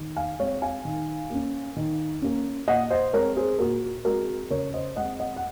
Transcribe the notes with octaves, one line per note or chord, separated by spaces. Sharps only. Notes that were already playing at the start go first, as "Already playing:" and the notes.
Already playing: D#3
F5 G#5
G#3 C4 C#5 F5
F5 G#5
D#3
A#3 C#4
D#3
A#3 C#4
A#2 D#5 F#5
C5 D#5
G#3 C4 A#4 C#5
G#4 C5
A#2 F#4 A#4
G#3 C4 F#4 A#4
C#3 A#4 C#5
C5 D#5
G#3 C4 D#5 F#5
D#5 F#5
F#5